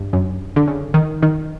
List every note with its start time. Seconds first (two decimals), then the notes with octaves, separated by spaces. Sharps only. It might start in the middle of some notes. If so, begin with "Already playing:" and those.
Already playing: G2
0.13 F#2
0.56 D3
0.68 C#3
0.94 D#3
1.23 D#3